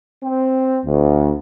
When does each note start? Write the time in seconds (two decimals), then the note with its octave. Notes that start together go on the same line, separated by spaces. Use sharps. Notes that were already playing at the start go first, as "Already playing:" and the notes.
0.24 C4
0.86 D2